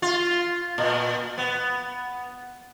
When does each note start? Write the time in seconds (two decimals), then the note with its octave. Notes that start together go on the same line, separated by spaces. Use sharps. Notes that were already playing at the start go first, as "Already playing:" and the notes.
0.02 F4
0.78 A#2
1.38 B3